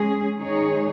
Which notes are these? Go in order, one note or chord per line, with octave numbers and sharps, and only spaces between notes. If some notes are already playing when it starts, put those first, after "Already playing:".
Already playing: G#3 C#4 G#4
D#3 G#3 D#4 G#4 C#5